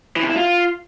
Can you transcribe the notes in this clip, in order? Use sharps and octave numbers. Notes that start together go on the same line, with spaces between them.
E3
C3
E4
F4